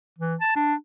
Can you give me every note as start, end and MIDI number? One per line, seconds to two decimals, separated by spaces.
0.18 0.36 52
0.41 0.56 81
0.56 0.74 62